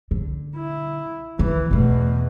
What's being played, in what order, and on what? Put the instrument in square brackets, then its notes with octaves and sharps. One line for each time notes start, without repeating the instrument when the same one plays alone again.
[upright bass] D3
[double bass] E4
[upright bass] D#3 [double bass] E3
[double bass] E2 B2 [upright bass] E3 A3